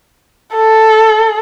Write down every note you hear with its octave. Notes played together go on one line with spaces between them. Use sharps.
A4